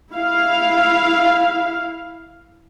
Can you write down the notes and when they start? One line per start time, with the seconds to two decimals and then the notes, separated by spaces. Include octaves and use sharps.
0.12 E4 F5